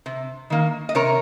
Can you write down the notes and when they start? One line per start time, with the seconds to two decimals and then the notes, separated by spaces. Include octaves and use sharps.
0.06 C3
0.50 D#3 A#3
0.89 D#5
0.95 C3 A#4 C#5